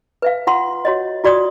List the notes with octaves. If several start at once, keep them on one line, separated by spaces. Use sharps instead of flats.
B4 E5 F5
F4 F#5 C6
F#4 C#5 D#5
F4 F#4 D5 C6 D#6